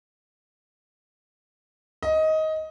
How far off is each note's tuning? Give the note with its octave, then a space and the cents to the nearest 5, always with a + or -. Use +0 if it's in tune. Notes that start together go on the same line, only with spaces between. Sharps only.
D#5 +15